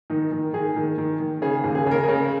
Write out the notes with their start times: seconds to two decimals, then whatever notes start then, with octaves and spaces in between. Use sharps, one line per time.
0.10 D#3 D#4
0.32 D#3
0.54 D#3 G#4
0.76 D#3
0.98 D#3
1.20 D#3
1.42 C#3 G#4
1.64 D#2
1.75 G#4
1.86 C#3
1.91 A#4
2.03 G#4
2.08 C#3 A#4